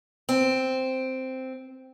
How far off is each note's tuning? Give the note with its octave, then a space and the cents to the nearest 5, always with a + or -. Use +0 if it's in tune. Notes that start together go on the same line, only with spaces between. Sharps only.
C4 -5